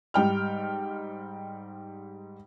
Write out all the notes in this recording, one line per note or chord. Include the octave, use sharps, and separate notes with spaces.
G#2 G3 G5 F6